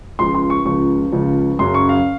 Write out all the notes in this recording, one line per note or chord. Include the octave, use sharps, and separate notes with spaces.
C#2 C#3 F3 C6
C6
C#6
C#2 C#3 F3 C#6
C#2 C#3 F3
F#2 C#3 F#3 C6
C#6
F5